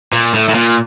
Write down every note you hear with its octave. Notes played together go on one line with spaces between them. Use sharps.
A#2
A2
A2
A#2